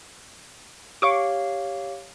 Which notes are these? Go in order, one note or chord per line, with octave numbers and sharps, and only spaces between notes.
G4 C#5 F5 C#6 D6